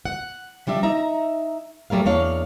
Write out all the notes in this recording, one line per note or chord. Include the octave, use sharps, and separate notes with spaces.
F#5
F3 G3 D4 E5
D#4 E5 A#5
F#3 G3 A3 A#4 F5
E2 A#3 D4 C#5 F5